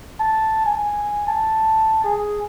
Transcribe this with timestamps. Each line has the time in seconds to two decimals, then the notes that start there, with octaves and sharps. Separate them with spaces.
0.20 A5
0.65 G#5
1.27 A5
2.04 G#4